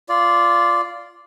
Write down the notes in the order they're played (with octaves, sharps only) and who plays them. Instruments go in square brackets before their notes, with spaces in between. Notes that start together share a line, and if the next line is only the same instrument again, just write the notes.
[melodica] F4 D5